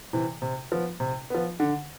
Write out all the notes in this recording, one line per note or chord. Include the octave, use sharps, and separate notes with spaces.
C3 E3
C3
F3 B3
C3
F3 B3
D3